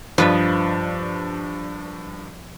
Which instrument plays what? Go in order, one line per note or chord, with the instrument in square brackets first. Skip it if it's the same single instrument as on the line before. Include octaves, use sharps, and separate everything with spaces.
[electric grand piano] G2 D4 [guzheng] F3 B4 D#5